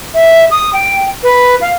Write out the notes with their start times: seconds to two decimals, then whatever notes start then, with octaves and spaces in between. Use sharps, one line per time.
0.14 E5
0.51 D#6
0.73 G5
1.23 B4
1.61 F5